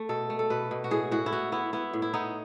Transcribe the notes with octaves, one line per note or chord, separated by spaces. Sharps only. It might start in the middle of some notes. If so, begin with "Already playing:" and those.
Already playing: A3
B2 A4
A3
A4
B2 B4
B2
F#4
A2 G#4
A2 F#4
E4
B3 F#4
B3 E4
B3 E4
A2
E4
B3 D#4